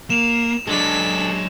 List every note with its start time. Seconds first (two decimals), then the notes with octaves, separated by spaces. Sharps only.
0.10 A#3 E7 F7
0.68 F#3 G#3 D4 G#4 A4 B6